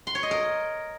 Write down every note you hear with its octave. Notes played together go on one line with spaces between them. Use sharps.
C6
C#5
D#5
A#4